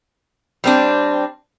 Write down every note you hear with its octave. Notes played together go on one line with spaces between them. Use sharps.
G3 C4 D4